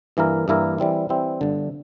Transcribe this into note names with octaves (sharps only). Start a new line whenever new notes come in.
G2 E3 A#3 E4 A#4
G2 E3 A#3 E4 A#4
E3 G3 C4 E4
E3 G3 C4 E4
G1 G2 D3